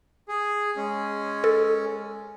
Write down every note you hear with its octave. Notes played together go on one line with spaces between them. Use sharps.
G#4
G#3 C#4
A4